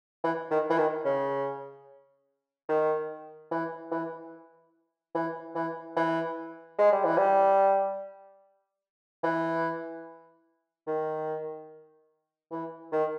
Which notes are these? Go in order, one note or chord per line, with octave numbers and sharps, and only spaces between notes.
E3
D#3
E3
D#3
C#3
D#3
E3
E3
E3
E3
E3
G#3
G3
E3
G3
E3
D#3
E3
D#3